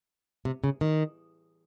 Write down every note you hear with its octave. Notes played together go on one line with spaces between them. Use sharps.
C3
C#3
D#3